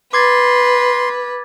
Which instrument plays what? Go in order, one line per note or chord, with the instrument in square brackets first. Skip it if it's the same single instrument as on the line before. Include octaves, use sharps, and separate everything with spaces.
[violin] B4 [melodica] C6 [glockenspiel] D6 G#6 A6